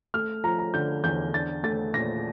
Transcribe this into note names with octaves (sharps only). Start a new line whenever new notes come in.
A3 F6
F3 A#5
A#5
D3 G6
E2 G6
D4 A6
A3 A6
A#2 A#6